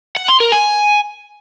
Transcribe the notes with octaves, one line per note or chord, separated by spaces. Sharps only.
F#5
C6
A#4
G#5